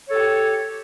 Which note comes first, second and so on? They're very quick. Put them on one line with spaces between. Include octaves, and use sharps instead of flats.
C#5 A4 G4